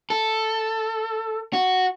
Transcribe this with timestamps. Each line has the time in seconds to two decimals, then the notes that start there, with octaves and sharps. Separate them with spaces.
0.10 A4
1.53 F#4